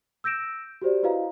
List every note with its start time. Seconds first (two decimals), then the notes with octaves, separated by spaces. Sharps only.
0.24 E6 G6 A#6 D7 E7
0.82 F#4 G4 C5 D5
1.03 E4 F#4 B4 D#5 F5 A#5